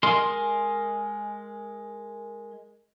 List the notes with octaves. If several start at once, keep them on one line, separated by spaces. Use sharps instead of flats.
G#3 A#4 D#5 G#5 C6